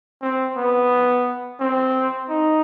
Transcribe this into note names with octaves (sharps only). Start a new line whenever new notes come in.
C4
B3
C4
D#4